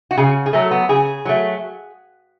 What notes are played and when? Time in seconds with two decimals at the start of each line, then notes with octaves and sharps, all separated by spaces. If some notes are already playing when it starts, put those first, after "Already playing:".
0.11 F#4
0.18 C#3 G#4
0.46 G#4
0.53 F#3 A3 A4
0.71 B3
0.89 C#3 G#4
1.25 F#3 A3